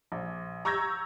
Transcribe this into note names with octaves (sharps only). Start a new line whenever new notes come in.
A#1
A#5 C#6 E6 G6 G#6 A#6